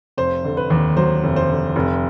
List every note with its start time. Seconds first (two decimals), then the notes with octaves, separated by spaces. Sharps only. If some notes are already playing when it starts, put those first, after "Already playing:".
0.18 F1 C5
0.45 D3
0.57 B4
0.70 D#2
0.97 F#3 C5
1.23 F1
1.36 C5
1.49 D3
1.76 F1